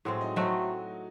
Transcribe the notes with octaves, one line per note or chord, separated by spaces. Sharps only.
A2 F#3 G#3 C4 F#4
D#4 D#5
F#3 A3 C4 D#4 F#4 D#5